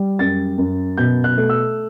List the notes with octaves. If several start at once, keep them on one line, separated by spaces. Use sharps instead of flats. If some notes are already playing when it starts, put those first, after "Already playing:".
Already playing: G3
F#2 A6
F#2
B2 G6
F#6
A3
E6